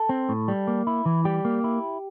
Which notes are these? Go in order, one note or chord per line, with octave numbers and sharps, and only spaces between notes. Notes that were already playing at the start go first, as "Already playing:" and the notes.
Already playing: A4
C4
A2
G3
A#3
E4
E3
G3 G4
A#3
E4